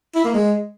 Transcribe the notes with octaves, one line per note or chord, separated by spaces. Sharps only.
E4
A#3
G#3